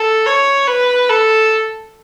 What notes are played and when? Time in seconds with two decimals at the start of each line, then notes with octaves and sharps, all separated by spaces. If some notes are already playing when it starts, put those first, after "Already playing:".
Already playing: A4
0.26 C#5
0.67 B4
1.10 A4